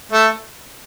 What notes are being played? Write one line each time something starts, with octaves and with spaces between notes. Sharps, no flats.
A3